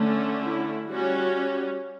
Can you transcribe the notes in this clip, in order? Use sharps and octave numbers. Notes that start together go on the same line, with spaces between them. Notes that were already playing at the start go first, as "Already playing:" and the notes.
Already playing: D3 A3 C#4
E4
G3 C#4 F#4